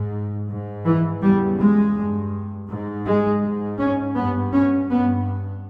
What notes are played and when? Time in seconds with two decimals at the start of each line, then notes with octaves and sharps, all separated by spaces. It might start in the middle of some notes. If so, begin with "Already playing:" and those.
Already playing: G#2
0.48 G#2
0.85 E3
1.21 E2 C#3 G3
1.59 G#3
1.95 G2
2.68 G#2
3.05 G#3
3.42 G#2
3.78 C#4
4.15 G2 B3
4.52 C#4
4.89 G2 B3